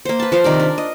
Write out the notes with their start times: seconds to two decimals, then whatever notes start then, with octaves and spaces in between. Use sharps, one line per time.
0.05 A#3 C5
0.20 B4 A5
0.32 F3 C5 F5
0.44 C3 D#3 A#4 D5
0.60 D4
0.78 D#5